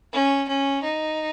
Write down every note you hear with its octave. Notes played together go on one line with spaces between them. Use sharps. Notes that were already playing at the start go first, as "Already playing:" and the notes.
C#4
C#4
D#4